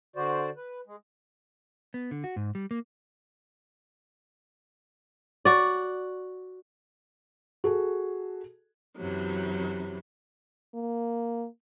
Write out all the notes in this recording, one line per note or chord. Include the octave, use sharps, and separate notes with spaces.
D3 F#4 C5 D5
B4
G#3
B3
D3
F#4
G#2
G3
A#3
F#4 D5
F#4 G#4 A4
F#2 C3 E3 F#3
A#3